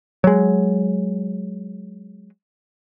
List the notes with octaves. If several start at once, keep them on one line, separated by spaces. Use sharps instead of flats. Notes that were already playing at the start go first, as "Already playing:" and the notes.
F#3 G#3